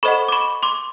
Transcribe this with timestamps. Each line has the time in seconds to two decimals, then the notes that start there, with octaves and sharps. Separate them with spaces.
0.03 A4 C5 D#5 F#5 B5 C#6
0.28 D6
0.32 B5 C#6
0.63 C6 D6